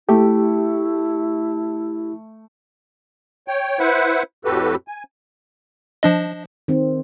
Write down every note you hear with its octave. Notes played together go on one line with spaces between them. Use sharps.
A3 E4 G4
C#5 G5
E4 B4 C5 E5 F#5
F2 A2 F#4 G4 A4 B4
G#5
F3 D4 D#5
D#3 C4